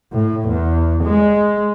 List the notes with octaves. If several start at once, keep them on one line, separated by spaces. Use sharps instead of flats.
A2
E2
G#3